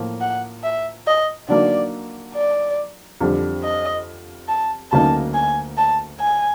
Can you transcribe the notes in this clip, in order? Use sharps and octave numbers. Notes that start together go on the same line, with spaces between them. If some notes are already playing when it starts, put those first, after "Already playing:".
Already playing: A2 F3 A#3
F#5
E5
D#5
D3 F#3 A#3 D#4 D5
D5
F2 D3 G3
D#5
A5
D2 C#3 F#3 A#3 D#4 A5
G#5
A5
G#5